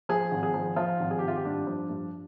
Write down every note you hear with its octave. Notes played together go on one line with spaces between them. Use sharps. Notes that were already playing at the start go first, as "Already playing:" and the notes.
F3 G#4
G#1
G#4
F3
F3 F4
G#1
G#4
G4
G#1
F4
G4
G2 D4
F3
G2